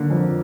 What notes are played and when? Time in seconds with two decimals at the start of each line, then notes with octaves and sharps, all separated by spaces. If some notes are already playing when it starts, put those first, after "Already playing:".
Already playing: D3 A#3
0.10 F2